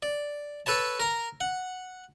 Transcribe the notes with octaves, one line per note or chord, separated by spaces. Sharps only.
D5
A4 B4 C#5 A5
A#4 A#5
F#5